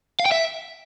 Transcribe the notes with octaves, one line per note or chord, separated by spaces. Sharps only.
F5
G5
E5